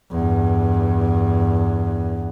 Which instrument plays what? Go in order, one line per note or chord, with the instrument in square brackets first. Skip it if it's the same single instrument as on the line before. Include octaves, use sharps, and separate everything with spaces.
[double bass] E2 G2